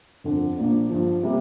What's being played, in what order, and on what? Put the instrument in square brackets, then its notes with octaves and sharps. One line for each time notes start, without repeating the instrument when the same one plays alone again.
[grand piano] G1 F2 D3
A#1 A#2 A#3 D4
G2 D3 F3
C3 G3 A#3